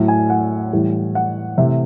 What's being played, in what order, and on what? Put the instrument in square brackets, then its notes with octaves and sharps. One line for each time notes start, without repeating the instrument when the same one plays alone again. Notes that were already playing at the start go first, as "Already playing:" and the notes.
Already playing: [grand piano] A2 F#3 A3
G#5
F#5
A2 E3 G3
F#5
C3 E3 A3 E5